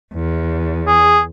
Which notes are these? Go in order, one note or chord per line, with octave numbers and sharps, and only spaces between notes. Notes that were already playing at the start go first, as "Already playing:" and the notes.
E2
G#4